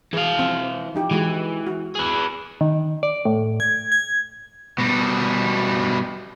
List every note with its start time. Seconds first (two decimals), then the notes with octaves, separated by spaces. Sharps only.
0.13 E3 G#4 F5
0.39 F3 C4 C5
0.95 F3 D#4 G4
1.11 E3 G#3 F#4 G4
1.67 F#4
1.95 G#4 B4
2.61 D#3
3.03 D5
3.25 A2
3.60 G#6
3.92 G#6
4.79 B2 G3